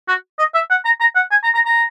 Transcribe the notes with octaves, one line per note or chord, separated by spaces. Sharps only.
F#4
D#5
E5
F#5
A#5
A#5
F#5
G#5
A#5
A#5
A#5